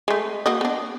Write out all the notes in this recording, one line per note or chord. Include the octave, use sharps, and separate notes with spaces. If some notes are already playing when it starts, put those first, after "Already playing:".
G#3 A3
A#3 F#4 D#5
B3 D4